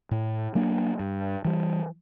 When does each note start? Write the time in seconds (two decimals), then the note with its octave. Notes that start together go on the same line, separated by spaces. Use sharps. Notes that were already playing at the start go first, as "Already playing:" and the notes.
0.11 A2
0.55 F#3 A#3 D4
0.99 G2
1.45 E3 G3